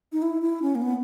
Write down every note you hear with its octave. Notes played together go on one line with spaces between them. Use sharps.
D#4
E4
E4
C#4
A#3
B3